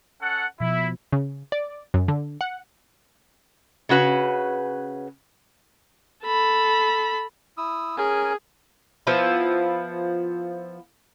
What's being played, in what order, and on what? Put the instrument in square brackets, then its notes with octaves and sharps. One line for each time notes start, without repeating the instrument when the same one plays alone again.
[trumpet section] C#4 A4 F#5
[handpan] B2 F3 [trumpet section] E4
[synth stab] C#3
D5
F#2
D3
F#5
[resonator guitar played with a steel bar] C#3 C#4 F#4 B4
[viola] A4 B5
[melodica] E4 D#6 E6
[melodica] C#4 A#4 G#5 [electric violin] G#4
[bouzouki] F3 B3 E4